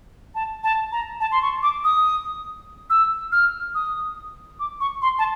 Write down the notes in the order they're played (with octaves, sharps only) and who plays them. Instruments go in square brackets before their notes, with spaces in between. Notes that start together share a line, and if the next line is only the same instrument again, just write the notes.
[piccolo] A5
A5
A#5
A5
C6
C#6
D6
D#6
E6
F6
D#6
D6
C#6
C6
A5